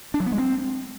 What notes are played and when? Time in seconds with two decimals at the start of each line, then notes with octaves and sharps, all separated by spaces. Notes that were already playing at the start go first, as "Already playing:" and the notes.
0.14 D4
0.20 F#3
0.26 B3
0.32 G#3
0.38 C4